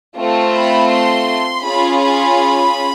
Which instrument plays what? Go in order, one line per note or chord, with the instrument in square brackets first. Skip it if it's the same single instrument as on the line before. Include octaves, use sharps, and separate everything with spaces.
[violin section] A3 C4 F4
B5
C6
C#4 F4 G#4 B5
B5